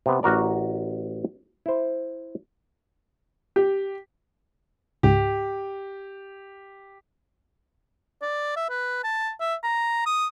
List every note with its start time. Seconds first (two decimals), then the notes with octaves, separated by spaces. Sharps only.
0.06 C3 B3
0.23 A1 F#4 A#4 D5
1.66 E4 C5
3.56 G4
5.03 C#2 G#2 G4
8.21 D5
8.56 E5
8.69 B4
9.04 A5
9.40 E5
9.63 A#5
10.06 D#6